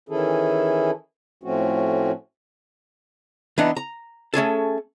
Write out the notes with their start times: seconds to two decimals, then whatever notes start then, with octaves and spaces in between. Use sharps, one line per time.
0.09 D#3 E3 C#4 E4 G#4 A4
1.43 A2 F3 A3 C4 C#4 F#4
3.58 E3 B3 D4 D#4
3.76 A#5
4.34 A3 C#4 G#4 A4